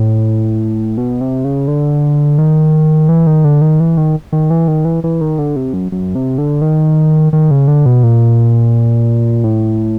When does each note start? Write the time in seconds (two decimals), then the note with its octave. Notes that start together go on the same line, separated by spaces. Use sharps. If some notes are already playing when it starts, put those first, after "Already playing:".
Already playing: A2
0.98 B2
1.21 C3
1.45 C#3
1.68 D3
2.39 D#3
3.09 E3
3.27 D#3
3.44 D3
3.62 D#3
3.80 E3
3.97 D#3
4.33 D#3
4.51 E3
4.68 D#3
4.85 E3
5.04 E3
5.21 D#3
5.39 D3
5.56 C3
5.73 F#2
5.92 F#2
6.15 C3
6.38 D3
6.62 D#3
7.33 D#3
7.51 C#3
7.68 D3
7.86 B2
8.03 A#2
9.44 A2